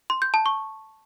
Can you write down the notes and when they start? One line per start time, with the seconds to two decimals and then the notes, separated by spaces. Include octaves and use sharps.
0.10 C6
0.22 G6
0.34 A5
0.46 C#6